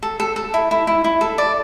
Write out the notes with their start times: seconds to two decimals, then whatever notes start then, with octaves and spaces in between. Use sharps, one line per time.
0.03 A4
0.20 A4
0.36 A4
0.54 E4
0.71 E4
0.87 E4
1.04 E4
1.21 A4
1.38 D5